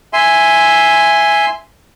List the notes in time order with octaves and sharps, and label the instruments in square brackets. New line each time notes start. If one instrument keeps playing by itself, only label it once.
[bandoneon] E5 G#5 C6